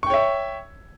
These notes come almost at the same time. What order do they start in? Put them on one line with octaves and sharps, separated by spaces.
C#6 G5 C#5 E5